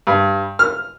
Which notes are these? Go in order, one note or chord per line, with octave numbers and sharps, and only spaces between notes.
G2
F6